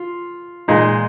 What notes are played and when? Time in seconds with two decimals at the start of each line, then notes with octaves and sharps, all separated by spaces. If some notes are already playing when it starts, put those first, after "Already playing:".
Already playing: F4
0.68 A#2 G#3 D#4